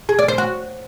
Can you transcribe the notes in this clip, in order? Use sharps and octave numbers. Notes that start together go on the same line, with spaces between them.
G#4
D5
C5
F#4